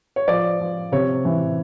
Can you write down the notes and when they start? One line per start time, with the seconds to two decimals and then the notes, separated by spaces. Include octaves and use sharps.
0.16 C#5
0.28 F3 D5
0.60 F3
0.92 C3 C#5
1.25 E3